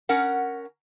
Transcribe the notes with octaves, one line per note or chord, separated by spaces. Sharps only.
C#4 A#4 F#5